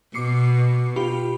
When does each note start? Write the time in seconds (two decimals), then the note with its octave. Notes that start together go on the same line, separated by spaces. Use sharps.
0.14 B2 D6 C7 C#7
0.96 F4 G4 B5